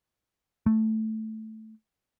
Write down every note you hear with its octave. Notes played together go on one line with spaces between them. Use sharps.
A3